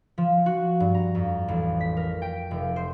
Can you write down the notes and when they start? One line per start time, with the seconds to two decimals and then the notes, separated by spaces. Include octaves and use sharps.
0.18 F3
0.46 F#4
0.80 G2
0.95 A#5
1.15 F2
1.48 A1
1.81 B6
1.97 A#4
2.22 G5
2.51 F1
2.76 C5